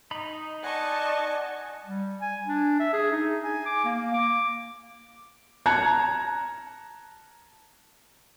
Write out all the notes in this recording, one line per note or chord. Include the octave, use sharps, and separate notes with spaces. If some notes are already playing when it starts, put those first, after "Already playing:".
D#4 B5
D5 D#5 F#5 G#5 A5 C#6
G3
G#5
D4
E5
G#4
D#4
G#5
D6
A#3
D6
A5 A#5 F#6 G#6 C#7